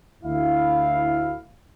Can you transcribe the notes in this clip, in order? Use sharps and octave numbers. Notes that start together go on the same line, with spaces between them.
D2 E4 F5